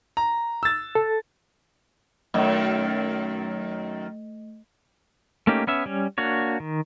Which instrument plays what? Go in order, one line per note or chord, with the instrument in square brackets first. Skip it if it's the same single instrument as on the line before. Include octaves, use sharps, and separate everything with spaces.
[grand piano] A#5
E6 A6
[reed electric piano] A4
[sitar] F#2 D#3 [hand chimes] A3 D#5
[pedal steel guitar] A3 A#3 C#4 D#4 G4
B3 C#4 E5
G3 C#4
A#3 D4 F#4 C#5
D#3